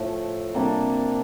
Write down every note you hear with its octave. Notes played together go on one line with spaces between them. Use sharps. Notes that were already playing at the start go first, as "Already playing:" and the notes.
Already playing: A2 F3 A3
C3 G3 A#3 D4